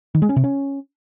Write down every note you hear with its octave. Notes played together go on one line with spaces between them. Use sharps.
D#3
G#3
C#4
C3
C#4